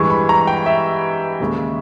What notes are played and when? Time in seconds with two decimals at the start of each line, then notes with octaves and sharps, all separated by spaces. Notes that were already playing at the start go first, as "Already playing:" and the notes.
Already playing: G2 E3 G#3 C#6
0.10 B5
0.29 A#5
0.47 G5
0.66 E5
1.40 D#2 C#3 G#3